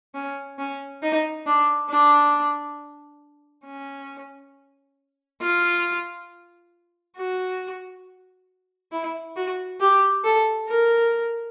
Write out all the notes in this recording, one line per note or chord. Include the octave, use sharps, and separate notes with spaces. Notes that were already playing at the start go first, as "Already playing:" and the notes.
C#4
C#4
D#4
D4
D4
C#4
F4
F#4
E4
F#4
G4
A4
A#4